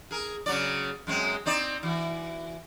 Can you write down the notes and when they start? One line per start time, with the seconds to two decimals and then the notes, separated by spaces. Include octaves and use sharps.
0.11 G#4 A#4
0.46 C#3 F#3 D5
1.07 F#2 G#3 C4
1.46 C4 D#4 D5
1.83 E3 F#4